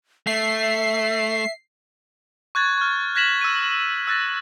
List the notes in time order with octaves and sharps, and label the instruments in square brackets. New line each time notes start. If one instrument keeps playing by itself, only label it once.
[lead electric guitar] A3 [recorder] E5 [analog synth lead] C7
[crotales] C#6 F#6 G#6 A6
C#6 F6
F#6 G#6 A#6 B6 E7 F#7
E6 D#7
E6 F#6 A6 A#6